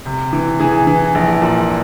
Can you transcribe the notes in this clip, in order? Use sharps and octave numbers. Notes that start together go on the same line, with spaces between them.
C3
E3
E3 G#4
E3
A#1
A#2